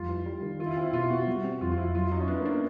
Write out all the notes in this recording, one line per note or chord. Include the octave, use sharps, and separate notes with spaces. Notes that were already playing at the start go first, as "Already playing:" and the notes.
Already playing: F2 G3 F4
E3
G3
D#3
D#3 F4
E4
F4
C4
E4
B2 F4
B3 F#4
G3
C4
F2 F4
F4
F2 E4
F#3 F4
E4
F#3 D#4
C#4
B3 D4
A#3
D4
A#3